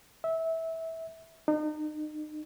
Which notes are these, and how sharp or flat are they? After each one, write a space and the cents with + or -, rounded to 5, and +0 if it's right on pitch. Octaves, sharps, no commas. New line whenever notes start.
E5 -20
D#4 -35